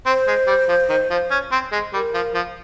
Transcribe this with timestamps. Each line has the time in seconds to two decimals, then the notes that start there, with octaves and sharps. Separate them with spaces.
0.06 C4 C5
0.27 G#3
0.47 G3
0.68 F3
0.89 D#3
1.10 F3
1.31 C#4
1.52 C4
1.72 G#3
1.93 G3 A#4
2.14 F3
2.34 F3